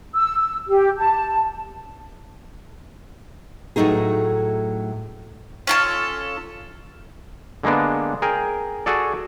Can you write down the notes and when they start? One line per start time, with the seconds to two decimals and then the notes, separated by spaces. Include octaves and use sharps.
0.15 E6
0.69 G4
0.97 A5
3.76 A2 F#3 A3 D#4 G#4
5.67 C#4 F4 A4
7.63 D3 G#3 A#3 B3 D4
8.22 G#4 A#4 G5
8.86 F#4 G#4 A4 D5